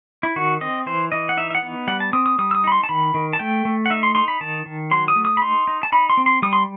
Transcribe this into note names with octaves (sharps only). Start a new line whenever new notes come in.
E4
D#3 F#4
C4 D#5
E3 C5
E3 D#5
F#5
D#4 E5
E5
F#5
B3
G3 F#5
A5
C4 D#6
D#6
G3 D#6
E6
D#6
D#4 B5
C6
A5
D#3 B5
D#3
A5
A3 G5
A3
F#5
D#4 E5
C6
D#4 C6
B5
D#3 A5
D#3
F#3 C6
D#6
A3
D#6
B5
D#4 C6
D#4
A5
D#4 B5
C6
C4
C6
G3 D#6
C6